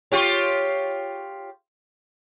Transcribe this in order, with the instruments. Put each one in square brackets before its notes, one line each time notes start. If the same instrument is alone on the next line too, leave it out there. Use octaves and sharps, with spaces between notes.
[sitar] F4 G4 C#5